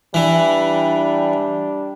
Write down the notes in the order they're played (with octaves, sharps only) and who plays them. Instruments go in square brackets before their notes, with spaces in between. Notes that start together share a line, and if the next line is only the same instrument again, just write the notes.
[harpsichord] E3 [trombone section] G3 D4